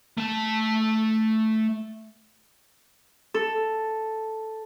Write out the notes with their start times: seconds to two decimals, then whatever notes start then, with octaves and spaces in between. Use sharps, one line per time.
0.17 A3 A5
3.34 A4